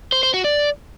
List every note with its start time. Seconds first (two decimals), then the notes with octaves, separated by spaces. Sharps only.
0.12 C5
0.23 C5
0.34 F#4
0.44 D5